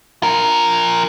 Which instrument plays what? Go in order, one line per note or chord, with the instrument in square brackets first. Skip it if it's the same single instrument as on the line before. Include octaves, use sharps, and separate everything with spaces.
[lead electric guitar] F3 A#4